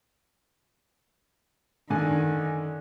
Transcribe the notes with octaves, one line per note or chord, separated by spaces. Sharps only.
F#2 D3 D#3 G#5